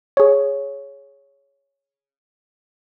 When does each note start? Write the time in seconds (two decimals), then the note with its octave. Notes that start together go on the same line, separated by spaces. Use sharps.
0.17 G#4 C#5